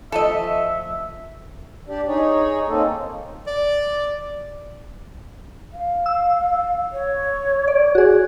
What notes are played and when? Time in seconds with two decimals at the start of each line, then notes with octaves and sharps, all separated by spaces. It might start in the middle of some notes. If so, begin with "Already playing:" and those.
0.12 F3 A3 A4 D#5 E5
1.88 D4 G4 D5
2.07 D#4 G#4 C#5
2.68 A#3 C4 C#4 D#4 A4
3.47 D5
5.74 F5
6.06 E6
6.92 C#5
7.68 D5
7.95 F#4 G#4